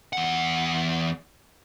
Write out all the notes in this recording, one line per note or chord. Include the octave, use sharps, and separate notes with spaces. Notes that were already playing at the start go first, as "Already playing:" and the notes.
E2 F#5